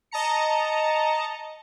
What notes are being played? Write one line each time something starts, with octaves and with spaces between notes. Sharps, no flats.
D#5 A5 A#5 C#7